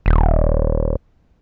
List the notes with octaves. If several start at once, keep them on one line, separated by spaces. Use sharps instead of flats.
D#1